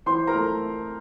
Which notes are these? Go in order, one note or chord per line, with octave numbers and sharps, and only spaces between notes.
E3 C5 C6
A#4 A#5
A3